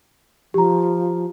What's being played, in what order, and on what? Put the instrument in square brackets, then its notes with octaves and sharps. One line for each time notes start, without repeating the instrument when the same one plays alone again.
[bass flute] F3 [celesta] G4 A#5